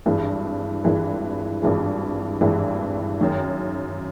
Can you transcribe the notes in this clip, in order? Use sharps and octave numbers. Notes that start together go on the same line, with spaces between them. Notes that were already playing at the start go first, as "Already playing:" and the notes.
G#1 G2 E3 G#3
G#1 G2 E3 G#3
G#1 G2 E3 G#3
G#1 G2 E3 G#3
F#2 D#3 G#3